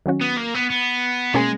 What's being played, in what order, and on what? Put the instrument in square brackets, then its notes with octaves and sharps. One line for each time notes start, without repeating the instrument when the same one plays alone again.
[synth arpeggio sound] D#3 F#3 C#4 F#4
[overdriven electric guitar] B3
A#3
B3
B3
[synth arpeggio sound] B2 A#3 C#4 G#4 [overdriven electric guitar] G#3